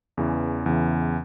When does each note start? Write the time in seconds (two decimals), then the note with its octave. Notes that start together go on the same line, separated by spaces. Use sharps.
0.17 E2 C#3 E3
0.66 E2 C#3 E3